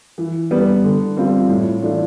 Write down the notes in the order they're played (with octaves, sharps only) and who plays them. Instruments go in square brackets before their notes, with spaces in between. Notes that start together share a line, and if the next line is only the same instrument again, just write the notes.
[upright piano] E3
G3 B3
D3
G3 C4 F4
A2
E3 A3 D4 F4